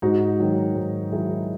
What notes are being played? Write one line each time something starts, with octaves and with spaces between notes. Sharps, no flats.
G#2 D#4 F#4
D#3 F#3
G#2
D#3 F#3 E4 G#4